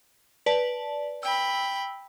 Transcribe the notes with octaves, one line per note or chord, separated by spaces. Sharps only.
B4 D5 A5
G5 B5 E6